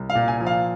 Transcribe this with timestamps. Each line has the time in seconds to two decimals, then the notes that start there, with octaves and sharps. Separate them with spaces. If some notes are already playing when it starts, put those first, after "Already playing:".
Already playing: C2
0.10 F5
0.15 A#2
0.28 G#5
0.40 F3
0.46 F5